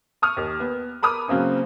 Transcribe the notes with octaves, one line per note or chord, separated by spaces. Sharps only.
C#6 D#6 F6
D#2
B3
A#4 B5 D6 D#6 F6
C#3 F#3 A#3 C4 C#4